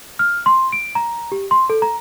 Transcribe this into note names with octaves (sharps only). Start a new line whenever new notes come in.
F6
C6
D7
A#5
G4
C6
A4
A#5